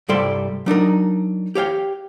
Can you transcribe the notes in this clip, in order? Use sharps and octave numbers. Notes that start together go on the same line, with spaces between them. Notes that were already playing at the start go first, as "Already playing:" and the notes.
C2 G2 G3 A4 D5 C6
F#3 D4 D#4 A#4
G4 C#5 F5 G5